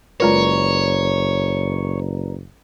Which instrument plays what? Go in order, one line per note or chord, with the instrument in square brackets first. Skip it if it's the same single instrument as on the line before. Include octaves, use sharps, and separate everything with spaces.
[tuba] F#1 [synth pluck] G#3 F4 A#4 [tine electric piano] B4 D5 A#5 [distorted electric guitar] C#5